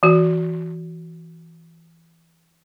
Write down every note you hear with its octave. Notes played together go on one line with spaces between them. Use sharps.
E3 F#4